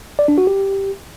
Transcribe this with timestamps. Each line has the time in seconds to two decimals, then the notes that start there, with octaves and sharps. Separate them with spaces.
0.19 D5
0.28 D4
0.38 F#4
0.47 G4